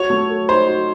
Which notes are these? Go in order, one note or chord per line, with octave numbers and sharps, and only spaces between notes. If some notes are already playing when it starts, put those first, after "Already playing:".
Already playing: F#4 C#5
A3
A4
D#4 C5
F#4